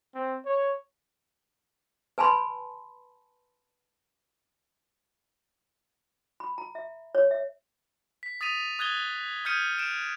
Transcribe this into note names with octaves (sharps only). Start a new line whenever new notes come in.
C4
C#5
B4 G#5 A5 B5 C6
B5
A#5
E5
C#5
E5
B6
D#6 A6 B6 D#7 F7
D#6 F#6 G#6 A6 G7
D#6 F6 G6 G#6 C#7 D#7
D7 E7